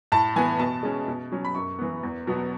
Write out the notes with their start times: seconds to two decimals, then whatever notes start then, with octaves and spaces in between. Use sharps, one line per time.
0.12 A2 A5
0.36 E3 B3 G#5
0.59 B2 A5
0.83 G#3 C#4
1.08 B2
1.32 F#3 C#4
1.45 B5
1.55 F#2 C#6
1.79 E3 B3
2.03 E2
2.27 B2 F#3 B3